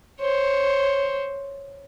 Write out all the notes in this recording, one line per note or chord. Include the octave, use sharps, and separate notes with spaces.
C5 C#5